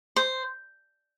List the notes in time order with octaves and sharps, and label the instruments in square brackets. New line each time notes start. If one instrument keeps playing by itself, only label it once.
[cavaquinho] C5